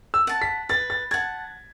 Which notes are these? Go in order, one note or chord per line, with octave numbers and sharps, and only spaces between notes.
E6
F#5 A5
B6
B4 A6
A6
F#5 A5 G#6